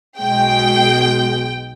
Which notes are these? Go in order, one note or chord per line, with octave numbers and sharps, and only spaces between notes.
B1 B2 G#3 G5